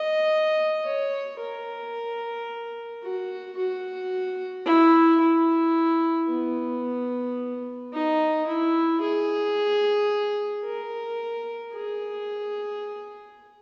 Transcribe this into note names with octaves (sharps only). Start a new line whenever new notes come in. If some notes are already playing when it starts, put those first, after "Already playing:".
Already playing: D#5
C#5
A#4
F#4
F#4
E4
E4
B3
D#4
E4
G#4
A#4
G#4